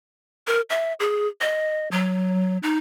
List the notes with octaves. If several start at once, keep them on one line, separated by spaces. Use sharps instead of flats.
A#4
E5
G#4
D#5
F#3
D#4